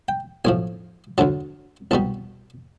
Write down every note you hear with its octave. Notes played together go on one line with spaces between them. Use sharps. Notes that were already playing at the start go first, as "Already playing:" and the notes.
G5
B1 A2 F3 G#5
D2 D3 F#3 A5
C2 B2 G3 A5